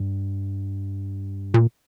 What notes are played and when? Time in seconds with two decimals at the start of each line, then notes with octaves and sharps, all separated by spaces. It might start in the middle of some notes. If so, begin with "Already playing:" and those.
Already playing: G2
1.54 A#2